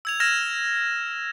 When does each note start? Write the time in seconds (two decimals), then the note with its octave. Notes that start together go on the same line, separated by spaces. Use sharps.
0.05 E6 G#6 F7
0.20 F6 G#6 A#6 E7